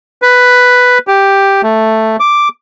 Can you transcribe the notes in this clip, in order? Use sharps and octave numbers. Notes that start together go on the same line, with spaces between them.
B4
G4
A3
D6